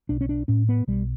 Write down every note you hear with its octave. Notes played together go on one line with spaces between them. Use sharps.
B1 D4
C#4
D4
A2 C#4
B3
B1 G3